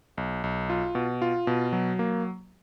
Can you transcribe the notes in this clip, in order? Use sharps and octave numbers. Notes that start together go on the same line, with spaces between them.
B1
B1
F4
B2
F4
B2
F#3
A#3